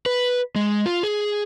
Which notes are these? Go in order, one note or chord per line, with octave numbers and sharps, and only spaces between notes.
B4
G#3
F4
G#4